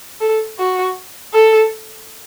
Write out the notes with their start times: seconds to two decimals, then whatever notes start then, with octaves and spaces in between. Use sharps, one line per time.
0.21 A4
0.59 F#4
1.33 A4